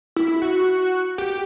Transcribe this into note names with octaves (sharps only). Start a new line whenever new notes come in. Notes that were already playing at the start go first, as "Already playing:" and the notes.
E4
F#4
G4